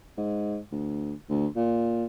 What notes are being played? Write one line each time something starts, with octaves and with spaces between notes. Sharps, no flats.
G#2
D2
D2
A#2